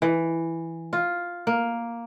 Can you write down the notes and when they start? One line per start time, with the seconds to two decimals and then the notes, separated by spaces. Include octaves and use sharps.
0.02 E3
0.93 F4
1.47 A#3